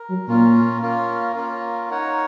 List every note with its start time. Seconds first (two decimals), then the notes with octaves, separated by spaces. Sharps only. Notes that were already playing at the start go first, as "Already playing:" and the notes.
Already playing: A#4
0.09 F#3
0.27 A#2 C#4 F4 A#4
0.81 A#3 C#4 F4 A#4
1.35 A#3 C#4 F4 A#4
1.90 D#4 A#4 C#5 F#5